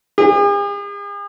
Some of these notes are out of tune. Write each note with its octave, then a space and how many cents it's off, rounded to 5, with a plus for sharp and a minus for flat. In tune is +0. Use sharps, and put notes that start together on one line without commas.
G#4 -45